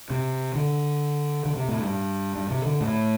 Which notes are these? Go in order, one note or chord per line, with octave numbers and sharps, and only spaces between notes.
C3
D3
D3
C3
A2
G2
G2
C3
D3
A2